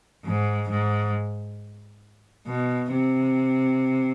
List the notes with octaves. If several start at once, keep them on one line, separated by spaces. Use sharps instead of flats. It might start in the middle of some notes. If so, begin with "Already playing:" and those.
G#2
G#2
B2
C3